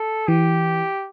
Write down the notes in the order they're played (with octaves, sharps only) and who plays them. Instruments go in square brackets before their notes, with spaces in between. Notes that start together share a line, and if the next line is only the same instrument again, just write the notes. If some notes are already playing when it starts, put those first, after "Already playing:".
Already playing: [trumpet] A4
[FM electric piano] E3 [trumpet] G4